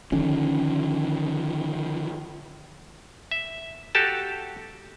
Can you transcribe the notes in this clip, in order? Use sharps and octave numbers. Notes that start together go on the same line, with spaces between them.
D3 D#3 F3 C#4
E5
F#4 G4 A4 A5